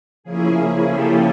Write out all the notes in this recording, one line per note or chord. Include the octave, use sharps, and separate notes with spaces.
C#3 F3 A#3 C#4 E4 G#4
G4 A4